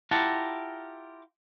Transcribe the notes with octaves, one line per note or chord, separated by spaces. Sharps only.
E4 F4 G4 A#4 F#5 A5